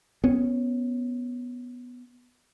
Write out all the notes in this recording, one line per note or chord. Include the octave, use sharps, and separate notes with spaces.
B3 C#4